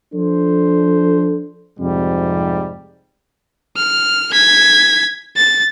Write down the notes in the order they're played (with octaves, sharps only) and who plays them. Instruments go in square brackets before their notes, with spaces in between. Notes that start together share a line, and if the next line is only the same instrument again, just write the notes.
[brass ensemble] F3 D4 A4 C5
F2 G#2 C3 G3
[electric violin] F6
G#6 B6
A6